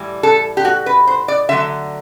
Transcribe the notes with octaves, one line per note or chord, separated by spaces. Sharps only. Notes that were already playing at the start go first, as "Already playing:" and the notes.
Already playing: A2 E3 G3
A4
G4
F#4
B4
C5
D5
D3 F#3 A3 E5